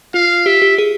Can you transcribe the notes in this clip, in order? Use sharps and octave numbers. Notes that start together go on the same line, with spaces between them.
F4 F5
G4 E5
G4
G#4